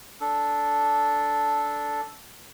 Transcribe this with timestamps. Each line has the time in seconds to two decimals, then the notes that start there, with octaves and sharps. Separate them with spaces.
0.21 D4 A4